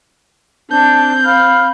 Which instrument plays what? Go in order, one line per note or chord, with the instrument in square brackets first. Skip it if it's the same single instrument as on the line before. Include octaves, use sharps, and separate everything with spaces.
[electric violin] C4 G6 [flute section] D4 A5
[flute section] F5 B5 F6